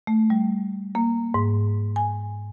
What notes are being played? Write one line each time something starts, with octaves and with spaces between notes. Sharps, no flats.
A3
G3
A#3
G#2
G#5